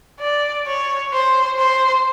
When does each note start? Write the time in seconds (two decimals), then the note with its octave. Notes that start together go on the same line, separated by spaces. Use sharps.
0.20 D5
0.67 C#5
1.13 C5
1.59 C5